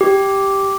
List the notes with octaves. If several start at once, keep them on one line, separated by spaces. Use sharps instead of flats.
G4